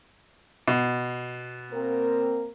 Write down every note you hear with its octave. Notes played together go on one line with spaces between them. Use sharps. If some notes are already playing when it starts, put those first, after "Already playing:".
B2
A#3 C4 A#4